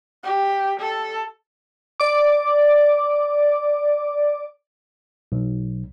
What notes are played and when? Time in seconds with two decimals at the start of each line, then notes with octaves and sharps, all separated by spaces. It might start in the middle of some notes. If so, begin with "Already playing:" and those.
0.23 G4
0.80 A4
2.00 D5 D6
5.32 B1